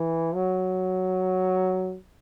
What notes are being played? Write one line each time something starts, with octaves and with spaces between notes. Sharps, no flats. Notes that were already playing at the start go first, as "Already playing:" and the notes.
Already playing: E3
F#3